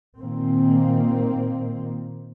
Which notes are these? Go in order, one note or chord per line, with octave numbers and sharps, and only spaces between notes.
A#2 D#3 A#3 C4